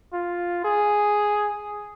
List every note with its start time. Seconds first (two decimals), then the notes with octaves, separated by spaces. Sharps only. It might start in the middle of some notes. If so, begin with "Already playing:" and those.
0.13 F4
0.64 G#4